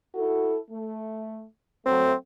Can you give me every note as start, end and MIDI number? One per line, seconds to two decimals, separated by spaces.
0.15 0.56 64
0.15 0.56 66
0.15 0.56 69
0.70 1.43 57
1.86 2.12 54
1.86 2.12 57
1.86 2.14 60